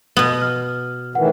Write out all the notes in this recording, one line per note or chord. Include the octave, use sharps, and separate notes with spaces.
B2 B3
F6
A2 D#3 E3 F#5